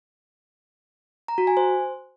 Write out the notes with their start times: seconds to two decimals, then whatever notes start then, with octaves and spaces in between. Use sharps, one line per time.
1.28 A#5
1.38 F#4
1.47 G#5
1.57 C5